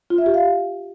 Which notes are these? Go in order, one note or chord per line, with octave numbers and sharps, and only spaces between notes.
F4
E5
G4
F5